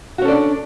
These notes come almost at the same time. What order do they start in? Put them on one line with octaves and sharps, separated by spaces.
F#4 C#4 A4 D5 D4